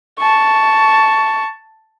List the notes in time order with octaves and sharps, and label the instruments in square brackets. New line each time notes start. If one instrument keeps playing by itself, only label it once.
[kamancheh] A5 C#6